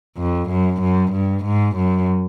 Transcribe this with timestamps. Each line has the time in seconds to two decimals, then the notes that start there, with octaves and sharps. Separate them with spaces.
0.17 F2
0.50 F#2
0.81 F#2
1.12 G2
1.44 G#2
1.76 F#2